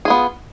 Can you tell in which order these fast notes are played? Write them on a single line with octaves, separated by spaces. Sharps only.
G#4 F4 B3